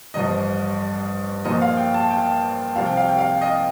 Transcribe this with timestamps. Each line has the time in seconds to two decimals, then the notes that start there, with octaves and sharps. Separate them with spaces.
0.14 A1 G2 F3 D#5
1.45 A#1 A#2 F3 D#5
1.62 F5
1.77 G5
1.94 A5
2.11 G5
2.76 C2 C3 F3 F5
2.86 G5
2.97 F5
3.08 G5
3.18 F5
3.41 D#5